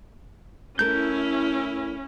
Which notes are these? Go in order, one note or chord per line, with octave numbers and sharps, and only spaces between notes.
A3 C#4 E4 A#4 G6